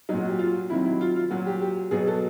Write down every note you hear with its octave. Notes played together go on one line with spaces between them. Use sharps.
A#2 F#3 D#4
F#4
G4
F4
C3 D#3 F#3 E4
E4
F4
F4
A#2 F#3 F#4
G4
G4
B2 F#3 G#4
A4